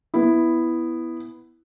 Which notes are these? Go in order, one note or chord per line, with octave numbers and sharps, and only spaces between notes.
B3 E4